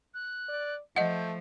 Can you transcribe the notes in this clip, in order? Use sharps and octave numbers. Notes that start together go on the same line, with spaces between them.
F#6
D5
F3 A3 D#5 F#5 G6